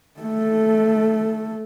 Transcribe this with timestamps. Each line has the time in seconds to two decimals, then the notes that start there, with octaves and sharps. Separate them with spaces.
0.21 A3 A4